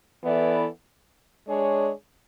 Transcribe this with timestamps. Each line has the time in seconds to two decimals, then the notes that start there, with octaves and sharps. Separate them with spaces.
0.24 E3 B3 E4 A4 D5
1.48 G#3 D4 G#4 C#5